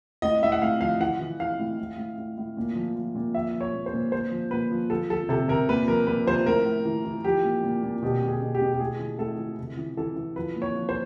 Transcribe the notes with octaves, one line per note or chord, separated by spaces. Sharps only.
A2 D#5
A2 E5
F#5
A2 F5
F3 F5
E3 F#5
E3
E3 F5
A2
A2
A2
A2
A2
A#2
F3
F3
A#2
F3 E5
F3
C#5
A#2
C5
A#2
A#2 C5
F3
A#2 B4
F3
F3 A4
F3 A4
C3 A4
C3 A#4
A#2 B4
F3 A#4
A#2 B4
F3 C5
A2 A#4
A2
E3
E3
F3 G4
A#2
A#2
A#2
B2 G4
B2
G#4
B2
G4
B2
G4
A2 G#4
E3
A2 A4
E3
C3
E3
E3 A4
E3
F3 B4
A#2
C#5
F3
C5